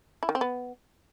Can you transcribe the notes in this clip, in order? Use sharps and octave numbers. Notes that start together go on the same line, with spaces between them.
E4
D#3
C4
B3